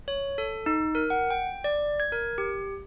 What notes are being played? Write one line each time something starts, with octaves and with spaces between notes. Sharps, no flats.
C#5
A4
D#4
A#4
F#5
G5
D5
G#6
A#4
G4